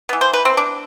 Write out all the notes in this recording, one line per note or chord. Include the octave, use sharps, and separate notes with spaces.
E3 B3
C5
B4
C4
D4